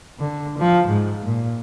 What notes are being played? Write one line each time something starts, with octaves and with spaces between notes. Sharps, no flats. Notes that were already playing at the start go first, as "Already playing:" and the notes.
D3
F3
G#2
A#2